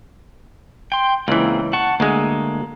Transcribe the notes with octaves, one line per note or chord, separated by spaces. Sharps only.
G5 C6
C#2 E3 A#3 C4 G#4
F#5 A5 C#6
D2 G#3 A#3 G#4 A4